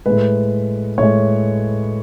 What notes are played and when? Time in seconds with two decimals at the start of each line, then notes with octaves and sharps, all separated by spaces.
0.06 A2 G#3 B4
0.98 A2 G#3 C#5